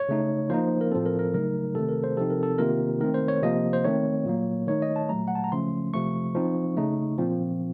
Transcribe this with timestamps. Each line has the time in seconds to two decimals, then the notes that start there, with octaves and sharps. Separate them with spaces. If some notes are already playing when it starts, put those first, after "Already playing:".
Already playing: C#5
0.09 C#3 A3 D#4
0.50 F3 A#3 D#4 C5
0.81 A#4
0.91 A2 F3 C4 A4
1.06 A#4
1.19 A#4
1.34 C#3 F#3 A3 D#4 A#4
1.75 C3 D#3 A3 C4 A4
1.89 A#4
2.04 C5
2.17 C3 F3 C4 D#4 A4
2.30 A#4
2.43 A4
2.58 C3 D#3 A#3 F4 A#4
3.01 D#3 A3 C4 A#4
3.14 C5
3.28 C#5
3.42 C3 F3 A#3 D#5
3.73 C5
3.84 D#3 A3 C4 C#5
4.25 A#2 F#3 A#3
4.67 D#3 A3 D#4 C#5
4.82 D#5
4.96 A5
5.09 A#2 F#3 A3 A#5
5.28 F#5
5.35 A5
5.44 A#5
5.52 C#3 F3 A3 C#4 C6
5.94 C3 F3 A3 C#6
6.35 F3 C4 D#4
6.77 C#3 A3 D#4
7.18 A#2 F3 C4